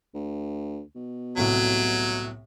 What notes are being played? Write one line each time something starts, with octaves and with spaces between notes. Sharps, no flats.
D2
B2
C2 A2 C3 F#3